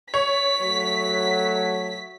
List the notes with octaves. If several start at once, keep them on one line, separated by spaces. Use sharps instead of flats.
C#5 B6
F#3 A3